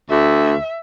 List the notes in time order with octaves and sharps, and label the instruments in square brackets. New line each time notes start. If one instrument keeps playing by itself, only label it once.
[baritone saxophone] D2 [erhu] E5